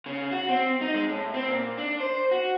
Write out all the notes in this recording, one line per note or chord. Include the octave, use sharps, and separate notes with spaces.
C#3
F#4
C4
D#4
G#3
A2
C4
A#2
D4
C5
F#4